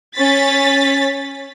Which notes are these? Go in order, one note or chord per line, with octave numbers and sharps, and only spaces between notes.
C#4 A6 B6